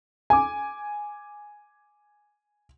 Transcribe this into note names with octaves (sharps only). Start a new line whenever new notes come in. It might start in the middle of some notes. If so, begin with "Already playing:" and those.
G#5 D6